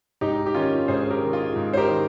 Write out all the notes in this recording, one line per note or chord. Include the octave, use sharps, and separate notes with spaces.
G#2 D#4 G4
G4
D#3 C#4 F4
G#2 G#4 C5
G4 A#4
D#3
F4 G#4
G#2
C5
G4 A#4
D#3